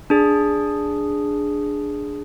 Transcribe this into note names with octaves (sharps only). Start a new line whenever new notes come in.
D4 G#4